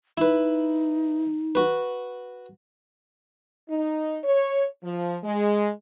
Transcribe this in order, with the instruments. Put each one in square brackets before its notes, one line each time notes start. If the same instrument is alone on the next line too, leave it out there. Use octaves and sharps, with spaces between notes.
[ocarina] D#4 [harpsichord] E4 B4
[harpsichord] F#4 B4
[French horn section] D#4
C#5
F3
G#3